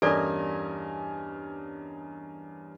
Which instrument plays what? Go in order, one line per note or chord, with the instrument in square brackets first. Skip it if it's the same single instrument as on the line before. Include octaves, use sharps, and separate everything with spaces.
[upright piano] E2 C#4 D#5 [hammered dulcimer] G2 [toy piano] A4 D5 [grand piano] A#4 G#5